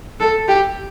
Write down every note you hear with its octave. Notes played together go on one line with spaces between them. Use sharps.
A4
G4